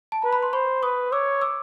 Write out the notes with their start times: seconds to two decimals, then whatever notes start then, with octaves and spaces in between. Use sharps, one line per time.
0.12 A5
0.22 B4 A#5
0.33 B5
0.43 C6
0.53 C5 B5 C#6
0.83 B4 C#6 D#6
1.12 C#5 D6 E6
1.41 D6 E6